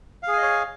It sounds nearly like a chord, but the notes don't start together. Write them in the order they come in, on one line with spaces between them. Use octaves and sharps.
F5 G#4 G#5 D#5 C#5